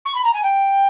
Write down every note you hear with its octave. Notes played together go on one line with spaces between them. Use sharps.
C#6
B5
A#5
G#5
G5